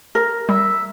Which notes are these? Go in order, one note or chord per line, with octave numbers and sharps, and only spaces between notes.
A#4
G3 E5